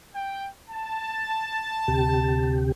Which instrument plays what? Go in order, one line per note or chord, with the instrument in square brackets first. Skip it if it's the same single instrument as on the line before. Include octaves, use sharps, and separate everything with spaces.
[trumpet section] G5
A5
[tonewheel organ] D2 C3 G4